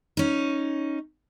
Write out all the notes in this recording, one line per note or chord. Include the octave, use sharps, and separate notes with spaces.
C#4 D#4